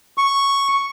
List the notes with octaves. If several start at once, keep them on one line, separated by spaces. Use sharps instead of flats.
C#6